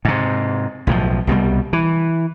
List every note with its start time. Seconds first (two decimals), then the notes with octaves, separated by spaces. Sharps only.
0.05 G#2 C3
0.87 B1 A2 D#3 F3
1.27 C2 B2 E3 G3
1.73 E3